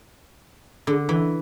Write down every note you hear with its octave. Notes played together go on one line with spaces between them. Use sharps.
D3
E3